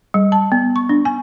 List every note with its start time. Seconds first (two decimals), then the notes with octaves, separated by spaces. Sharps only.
0.14 G3
0.32 A5
0.52 B3
0.76 C#6
0.89 D4
1.05 G#5